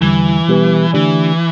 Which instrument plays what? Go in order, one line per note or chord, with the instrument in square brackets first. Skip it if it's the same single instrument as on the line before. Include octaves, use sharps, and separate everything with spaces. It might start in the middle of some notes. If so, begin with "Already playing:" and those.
[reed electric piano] E2 D3 G3 [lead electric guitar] E3
[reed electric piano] B2 G3 B3 G4 B4
[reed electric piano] D3 A3 D4 G4 D5 [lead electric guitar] E3